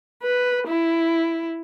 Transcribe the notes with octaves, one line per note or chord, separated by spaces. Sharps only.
B4
E4